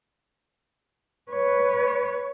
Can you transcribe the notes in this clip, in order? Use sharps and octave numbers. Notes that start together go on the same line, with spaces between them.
B4 C#5